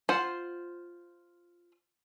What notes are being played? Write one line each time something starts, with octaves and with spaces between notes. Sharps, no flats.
F4 C5 F#5